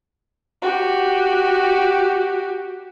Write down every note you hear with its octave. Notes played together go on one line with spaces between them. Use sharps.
F#4 G4